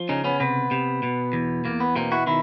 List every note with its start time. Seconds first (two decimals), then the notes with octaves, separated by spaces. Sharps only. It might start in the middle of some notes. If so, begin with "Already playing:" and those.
Already playing: F3
0.09 C#3 C#4 D#4
0.24 B3 C#4
0.40 C3 B3
0.71 C3
1.03 B2
1.33 E2
1.65 E2 A#3
1.80 B3
1.96 B2 A#3 C4
2.12 E4 F#4
2.27 D#3 E4